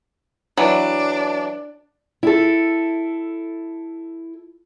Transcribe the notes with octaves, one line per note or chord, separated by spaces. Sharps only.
E3 F#3 D4
E4 A4